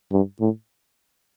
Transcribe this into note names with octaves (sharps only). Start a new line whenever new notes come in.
G2
A2